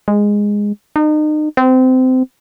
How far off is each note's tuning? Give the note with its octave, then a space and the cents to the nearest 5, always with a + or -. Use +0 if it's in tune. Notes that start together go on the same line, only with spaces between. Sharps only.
G#3 -10
D#4 -35
C4 -25